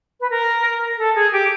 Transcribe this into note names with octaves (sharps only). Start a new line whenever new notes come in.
B4
A#4
A4
G#4
G4